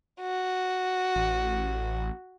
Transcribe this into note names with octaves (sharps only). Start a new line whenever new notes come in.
F#4
A1